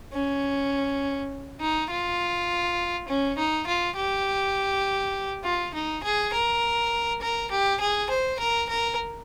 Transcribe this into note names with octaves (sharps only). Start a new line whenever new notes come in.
C#4
D#4
F4
C#4
D#4
F4
G4
F4
D#4
G#4
A#4
A#4
G4
G#4
C5
A#4
A#4